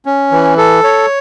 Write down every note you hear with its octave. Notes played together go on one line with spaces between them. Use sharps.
C#4
E3
A4
C#5